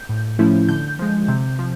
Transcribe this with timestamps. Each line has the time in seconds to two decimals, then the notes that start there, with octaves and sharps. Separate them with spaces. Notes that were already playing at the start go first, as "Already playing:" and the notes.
Already playing: G6
0.09 A2
0.39 F3 A3 C#4 E4
0.69 D3 G6
0.99 F3 G#3
1.28 C3
1.59 F3